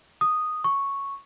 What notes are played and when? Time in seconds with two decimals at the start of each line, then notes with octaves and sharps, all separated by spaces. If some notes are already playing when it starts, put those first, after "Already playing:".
0.21 D#6
0.64 C#6